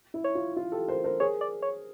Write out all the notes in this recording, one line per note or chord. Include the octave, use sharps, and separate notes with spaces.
E4
C#5
F4
F4
G4 A4
A#4 C5
A#4 C5
G#4 A#4 C#5
D5
C#5